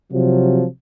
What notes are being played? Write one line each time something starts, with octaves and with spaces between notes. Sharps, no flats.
C3 F3 F#3